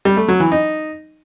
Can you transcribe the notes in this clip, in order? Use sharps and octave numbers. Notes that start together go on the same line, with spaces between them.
G3
A3
F#3
E3
D#4